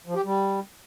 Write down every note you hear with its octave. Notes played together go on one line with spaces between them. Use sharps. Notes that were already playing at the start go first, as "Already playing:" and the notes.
F3
G4
G3